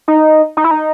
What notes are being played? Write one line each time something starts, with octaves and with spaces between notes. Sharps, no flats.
D#4
D#4
E4
D#4